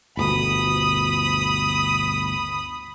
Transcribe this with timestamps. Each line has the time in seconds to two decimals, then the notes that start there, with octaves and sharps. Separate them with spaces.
0.17 G1 D2 B2 B5 D#6